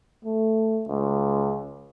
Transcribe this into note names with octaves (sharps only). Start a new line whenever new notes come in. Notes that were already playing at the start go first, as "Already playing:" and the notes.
A3
C#2